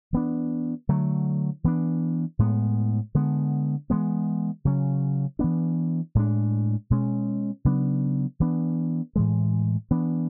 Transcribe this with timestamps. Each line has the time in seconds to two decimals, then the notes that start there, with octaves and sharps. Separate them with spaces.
0.13 E3 B3 D4
0.89 D3 F#3 A3
1.64 E3 B3 D4
2.39 A2 G#3 B3
3.15 D3 G#3 B3
3.90 E3 G#3 B3
4.65 C#3 F#3 C#4
5.39 E3 B3 D4
6.15 A2 G#3 D4
6.90 B2 G#3 C#4
7.65 C#3 F#3 B3 D4
8.40 E3 B3 D4
9.16 A2 E3 G#3
9.91 E3 B3 D4